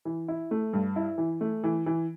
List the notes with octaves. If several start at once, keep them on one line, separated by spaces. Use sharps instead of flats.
E3
E4
A3
G2
E4
E3
A3
E3
E3